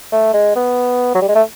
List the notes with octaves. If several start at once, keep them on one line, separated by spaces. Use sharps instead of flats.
A3
G#3
B3
F#3
G3
G#3
A3